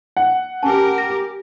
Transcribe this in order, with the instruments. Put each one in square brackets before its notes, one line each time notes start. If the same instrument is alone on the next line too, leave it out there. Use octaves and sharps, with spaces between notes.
[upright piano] F#5
[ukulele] C#4 G#5 [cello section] G4 A#4 [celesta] A5
[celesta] A#6